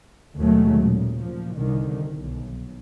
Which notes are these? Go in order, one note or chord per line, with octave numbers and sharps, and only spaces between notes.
D#2 B2 D#3 F#3 G#3 A3
A#2 C#3
A#2 F3
C2 D3 D#3
B1